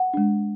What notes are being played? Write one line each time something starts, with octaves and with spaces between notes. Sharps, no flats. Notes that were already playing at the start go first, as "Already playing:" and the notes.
Already playing: F#5
G#3 D4